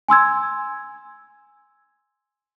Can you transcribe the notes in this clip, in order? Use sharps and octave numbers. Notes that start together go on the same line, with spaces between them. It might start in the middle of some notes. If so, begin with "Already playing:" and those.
G#5 C6 E6 G#6